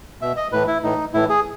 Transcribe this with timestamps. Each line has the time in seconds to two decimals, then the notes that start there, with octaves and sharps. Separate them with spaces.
0.21 B2 E5
0.37 D#5
0.52 A2 E3 B4
0.67 E4
0.83 A2 E3 D#4
1.14 A2 E3 E4
1.29 G#4